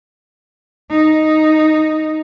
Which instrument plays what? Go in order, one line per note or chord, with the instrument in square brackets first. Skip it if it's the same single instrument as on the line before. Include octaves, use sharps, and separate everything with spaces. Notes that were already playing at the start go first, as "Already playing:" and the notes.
[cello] D#4